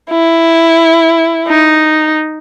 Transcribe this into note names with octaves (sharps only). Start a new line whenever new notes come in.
E4
D#4